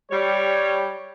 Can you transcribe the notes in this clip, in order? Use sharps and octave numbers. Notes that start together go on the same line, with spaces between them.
G3 C#5